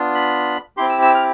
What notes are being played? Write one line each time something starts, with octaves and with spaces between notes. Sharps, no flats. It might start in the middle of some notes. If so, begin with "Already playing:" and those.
Already playing: B3 D4 F4
B5
C4 E4 G4 C6
E6
E6
F6